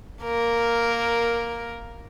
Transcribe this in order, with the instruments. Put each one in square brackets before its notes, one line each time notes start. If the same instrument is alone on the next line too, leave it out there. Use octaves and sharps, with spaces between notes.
[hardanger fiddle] A#3 A#4